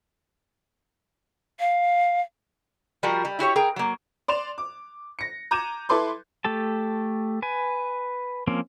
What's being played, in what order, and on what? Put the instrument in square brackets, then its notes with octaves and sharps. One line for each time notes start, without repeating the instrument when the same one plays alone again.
[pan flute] F5
[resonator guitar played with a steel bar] F3 G3 F4 F#4 A#4
G3
E4 F#4 G4 C#5
G#4 A#4 G5
F#3 A#3
[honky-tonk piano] D5 C6 E7 F7
D6
A#6 C#7
A#5 D6 G6 G#6 D#7 E7
E4 A4 B4 C6 D6
[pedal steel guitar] A3 G4 A4 A5
B4 G#5
F3 A#3 C4 C#4